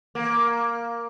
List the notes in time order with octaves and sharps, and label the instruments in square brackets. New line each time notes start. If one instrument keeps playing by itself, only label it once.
[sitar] A#3